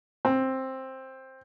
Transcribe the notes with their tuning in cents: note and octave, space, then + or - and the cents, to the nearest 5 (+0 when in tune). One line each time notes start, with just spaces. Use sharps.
C4 +10